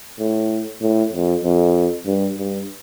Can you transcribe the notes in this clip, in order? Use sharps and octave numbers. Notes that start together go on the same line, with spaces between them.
A2
A2
F2
F2
G2
G2